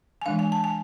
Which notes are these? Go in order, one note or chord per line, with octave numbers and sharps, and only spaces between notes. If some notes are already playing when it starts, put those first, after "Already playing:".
G#5
E3 G#3 D4 F5
G#5
A5
G#5